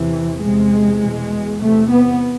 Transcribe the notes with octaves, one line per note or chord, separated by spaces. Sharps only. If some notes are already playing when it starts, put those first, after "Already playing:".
Already playing: E2 C3 E3
E2 C3 G#3
E2 B2
E2 C3 A3
B3